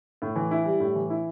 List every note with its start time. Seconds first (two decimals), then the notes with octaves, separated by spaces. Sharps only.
0.22 A2
0.36 E3
0.51 E4
0.65 G3
0.80 A2
0.95 E3
1.10 E4